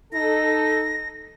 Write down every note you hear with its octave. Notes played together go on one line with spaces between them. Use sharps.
D#4 A4 A#6